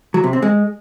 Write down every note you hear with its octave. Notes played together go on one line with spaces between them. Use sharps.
F#3
C3
C4
G#3